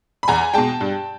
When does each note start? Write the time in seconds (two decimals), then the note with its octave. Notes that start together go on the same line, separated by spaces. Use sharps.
0.23 B5
0.28 E2 G#5 A#5
0.54 B2 G#3 G5 A5
0.81 G2